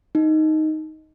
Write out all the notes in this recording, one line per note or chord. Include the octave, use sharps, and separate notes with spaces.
D#4